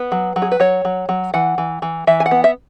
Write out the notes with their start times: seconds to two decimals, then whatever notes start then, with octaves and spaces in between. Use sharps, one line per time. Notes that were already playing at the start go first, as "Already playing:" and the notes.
Already playing: B3 B4
0.12 F#3
0.36 F#3
0.42 G#4
0.52 B4
0.60 F#3 C#5
0.85 F#3
1.09 F#3
1.34 E3 F#5
1.58 E3
1.82 E3
2.07 E3 E5
2.20 G#5
2.26 F#5
2.31 B3
2.44 E5